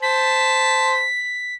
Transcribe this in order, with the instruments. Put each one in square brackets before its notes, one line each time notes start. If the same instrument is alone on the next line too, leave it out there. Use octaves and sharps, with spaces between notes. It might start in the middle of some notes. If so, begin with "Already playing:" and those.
[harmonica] C5 A5 [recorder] B6